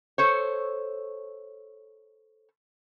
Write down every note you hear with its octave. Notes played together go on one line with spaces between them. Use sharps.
A4 C5 C#5